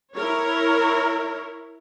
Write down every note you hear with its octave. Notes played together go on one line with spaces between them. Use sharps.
E4 A#4 C#5